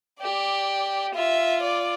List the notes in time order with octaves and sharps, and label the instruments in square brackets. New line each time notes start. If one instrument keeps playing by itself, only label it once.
[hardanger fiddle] G4 [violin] D5
[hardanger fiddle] F4 [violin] E5
[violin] D5